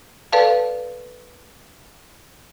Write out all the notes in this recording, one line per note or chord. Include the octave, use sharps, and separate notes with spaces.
A4 B4 D5 F5 A5